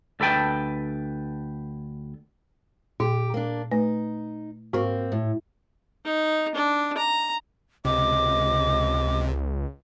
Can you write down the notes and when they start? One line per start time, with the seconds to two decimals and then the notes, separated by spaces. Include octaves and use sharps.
0.20 D2 A4 B4 G5 A5
3.00 A#2 G4
3.34 A#3 D4
3.72 A3 D#4 B4
4.73 G#2 A#3 C4 F#4 C#6
5.12 A2
6.05 D#4
6.55 D4
6.97 A#5
7.85 C#2 C3 D#5 D6